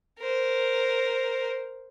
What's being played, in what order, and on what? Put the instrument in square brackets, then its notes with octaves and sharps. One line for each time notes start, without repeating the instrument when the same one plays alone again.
[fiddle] A#4 C5